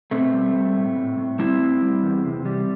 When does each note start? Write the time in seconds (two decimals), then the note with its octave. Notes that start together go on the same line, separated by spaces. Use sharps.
0.11 B2 A3 C4
0.33 G3
0.54 G3
0.76 A2
0.96 A2
1.18 A2
1.39 G3 C4 E4
1.61 A2
1.82 G3
2.03 E2
2.25 C3
2.45 G3